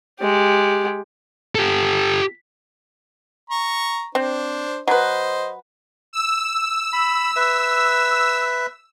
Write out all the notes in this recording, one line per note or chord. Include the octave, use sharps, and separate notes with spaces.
G#3 G4
G4 A4
A#5 C#6
C4 D4 C5
F#3 B4 C5 D#5
E6
B5
B4 E5